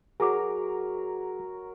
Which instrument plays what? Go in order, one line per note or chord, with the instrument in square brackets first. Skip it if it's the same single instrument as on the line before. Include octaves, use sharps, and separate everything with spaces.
[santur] F#3 A#4 [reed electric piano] G#4 D6